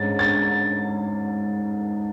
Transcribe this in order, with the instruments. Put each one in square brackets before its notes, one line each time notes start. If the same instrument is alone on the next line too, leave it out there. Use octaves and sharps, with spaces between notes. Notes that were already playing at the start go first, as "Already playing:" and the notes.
Already playing: [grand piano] G#2 G#3 C#4 A6
A6